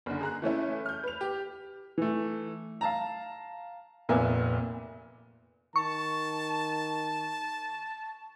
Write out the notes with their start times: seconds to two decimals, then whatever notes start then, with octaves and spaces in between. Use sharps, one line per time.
0.06 F#1 D3
0.21 G#4 A#5 F#6
0.42 E3 A3 C#4 E4
0.86 F6 G6
1.04 B4 F7
1.21 G4
1.98 E3 A3
2.81 F5 A5 A#5
4.09 F1 A#2 A#3 B3 E5 G#5
5.76 D#3 A5 C#6